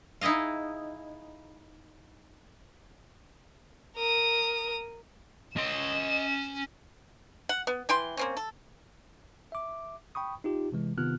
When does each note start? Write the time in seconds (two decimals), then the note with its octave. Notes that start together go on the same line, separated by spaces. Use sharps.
0.21 D#4 E4 G#4 D#5 F5
3.97 A#4 D#6
5.57 C#4 D#5 C6 E7
7.49 F#5
7.67 B3
7.89 E3 G5 C6
8.17 A#3 C4 C#4
8.37 A4
9.52 E5 D6
10.15 G5 B5 C#6 D#6
10.44 D#4 F4 G4
10.72 C3 E3 G#3
10.98 C3 D#3 B3 F4 F6 F#6